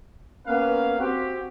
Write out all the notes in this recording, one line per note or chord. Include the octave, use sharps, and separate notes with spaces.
A#3 B3 C#4 A#4 B4 F5
C4 F#4 G4